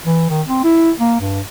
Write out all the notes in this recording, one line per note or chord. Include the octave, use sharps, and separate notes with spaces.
E3
D#3
C4
E4
A#3
G2